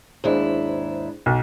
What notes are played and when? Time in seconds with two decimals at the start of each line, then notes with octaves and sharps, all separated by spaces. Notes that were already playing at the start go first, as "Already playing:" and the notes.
0.24 D#2 G#2 D4 E4 G#4 C5
1.26 B1